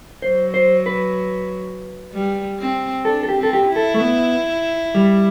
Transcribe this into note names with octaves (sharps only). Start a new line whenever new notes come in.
F#3 C5
C5
B4
G3
C4
D4 A4
A4
G4
C4
A4
G4
E4
A4
A3
B3
G3